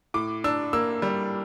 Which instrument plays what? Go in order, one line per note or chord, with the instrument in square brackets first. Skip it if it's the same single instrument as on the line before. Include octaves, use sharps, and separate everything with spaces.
[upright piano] A2 D6
D4 E6
A#3 E6
G3